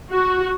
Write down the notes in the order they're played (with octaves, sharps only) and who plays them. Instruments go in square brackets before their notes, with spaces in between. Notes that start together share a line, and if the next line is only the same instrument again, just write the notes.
[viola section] F#4